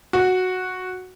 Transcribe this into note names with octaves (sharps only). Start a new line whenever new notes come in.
F#4